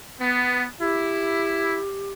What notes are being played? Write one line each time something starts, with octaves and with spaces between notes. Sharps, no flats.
B3
E4 G4